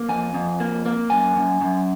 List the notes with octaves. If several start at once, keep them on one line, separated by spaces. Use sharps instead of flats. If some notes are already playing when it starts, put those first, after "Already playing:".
Already playing: A#3
F2 G#5
F2
A#3
A#3
F#2 G#5
F#2
F#2